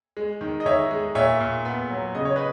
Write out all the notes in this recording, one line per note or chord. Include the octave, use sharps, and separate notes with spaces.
G#3
D#3
D#5
D#3 C#5 E5
G#3
A#2 C#5 E5
A#2
B3
F#3
C#3 D#5
C#5
B4 D#5